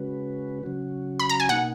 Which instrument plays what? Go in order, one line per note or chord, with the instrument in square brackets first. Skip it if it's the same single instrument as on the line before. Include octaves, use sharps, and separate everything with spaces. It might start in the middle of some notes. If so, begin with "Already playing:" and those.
Already playing: [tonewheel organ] C#3 G#3 C#4 F#4 B4
C#3 F#3 C#4 F#4
[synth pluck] B5
A#5
G#5
[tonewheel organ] B2 A#3 D#4 [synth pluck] F#5